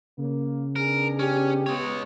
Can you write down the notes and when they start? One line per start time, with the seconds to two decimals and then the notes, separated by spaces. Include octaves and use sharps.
0.18 C#3 A#3
0.76 B3 D4 G#4 A#4
1.19 C#4 G4
1.66 G#3 B3 C#5